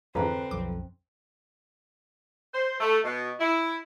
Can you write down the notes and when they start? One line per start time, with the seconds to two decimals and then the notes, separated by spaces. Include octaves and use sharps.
0.15 F2 G#2 D3 E3 C4 B4 A#5
0.51 B1 F2 D6
2.53 C5
2.80 A3
3.04 B2
3.39 E4